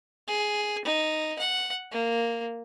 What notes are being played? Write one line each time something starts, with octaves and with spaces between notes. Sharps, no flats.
G#4
D#4
F#5
A#3